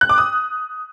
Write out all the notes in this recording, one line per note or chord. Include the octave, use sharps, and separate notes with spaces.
F#6
D6
D#6